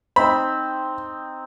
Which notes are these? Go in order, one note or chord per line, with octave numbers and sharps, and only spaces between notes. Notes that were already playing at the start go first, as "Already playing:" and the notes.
C4 D#4 B5